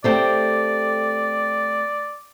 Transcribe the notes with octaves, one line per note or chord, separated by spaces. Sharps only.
A3 C4 G4 D5